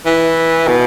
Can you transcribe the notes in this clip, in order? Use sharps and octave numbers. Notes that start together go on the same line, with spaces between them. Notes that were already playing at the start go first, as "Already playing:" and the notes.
E3
B2